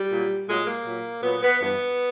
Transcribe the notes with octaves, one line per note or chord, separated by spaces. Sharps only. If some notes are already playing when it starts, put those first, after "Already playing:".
Already playing: G3
A#2 F#3
A#2 F#3 G#3
A#3
A#2 F#3
A#2 F#3 B3
B3
G2 E3 G3 B3